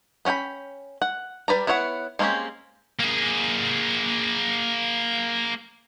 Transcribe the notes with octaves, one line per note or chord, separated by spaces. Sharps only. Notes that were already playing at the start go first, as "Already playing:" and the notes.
B3 C#4 F#5 G5 B5
F#5
G3 B4 D5 A#5
B3 E4 C#5 E5 F#5
G#3 A#3 C4 C#4 G4
A#3 G#4